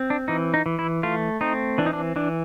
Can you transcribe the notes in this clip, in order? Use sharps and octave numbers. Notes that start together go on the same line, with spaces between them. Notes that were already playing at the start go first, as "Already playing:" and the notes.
Already playing: C4
D4
E3 D#4
D#4
E3
E4
A3 F4
C4 D#4
E3 D4
D#4
D4
E3 D4